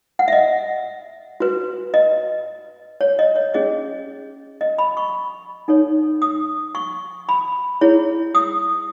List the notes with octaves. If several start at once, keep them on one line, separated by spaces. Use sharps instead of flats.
F#5
E5
D#5
F#4 B4
D#5
C#5
D#5
C#5
C#4 G#4 C#5 D#5
D#5
B5
C#6
D#4 A4 C#5
D#6
C#6
B5
E4 G#4 C#5
D#6